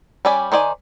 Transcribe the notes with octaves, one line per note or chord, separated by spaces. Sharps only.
G3 C#4 D5 G#5 B5
D#3 C5 D5 G#5